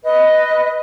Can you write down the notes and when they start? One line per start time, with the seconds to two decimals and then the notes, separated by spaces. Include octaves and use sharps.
0.03 B4 D#5